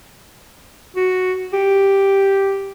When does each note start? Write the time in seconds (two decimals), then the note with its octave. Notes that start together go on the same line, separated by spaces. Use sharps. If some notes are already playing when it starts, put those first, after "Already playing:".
0.96 F#4
1.53 G4